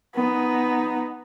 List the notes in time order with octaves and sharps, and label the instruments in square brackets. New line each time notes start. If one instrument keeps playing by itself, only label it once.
[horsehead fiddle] B3 D#4